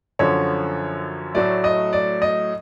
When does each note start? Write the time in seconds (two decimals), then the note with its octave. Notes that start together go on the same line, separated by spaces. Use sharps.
0.19 F#2 D3 F3 C#5
1.34 A2 F#3 A3 D5
1.64 D#5
1.93 D5
2.22 D#5